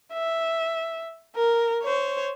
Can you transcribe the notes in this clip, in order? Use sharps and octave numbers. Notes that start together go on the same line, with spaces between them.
E5
A#4
C5 C#5